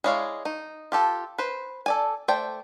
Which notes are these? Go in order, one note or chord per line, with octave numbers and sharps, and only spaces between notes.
G#3 E4 C#5 D5 F5
D#4
F4 G4 A4
B4 C5
A4 D5 G#5
A3 C5 D5 G5